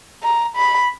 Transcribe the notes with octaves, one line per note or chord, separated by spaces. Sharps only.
A#5
B5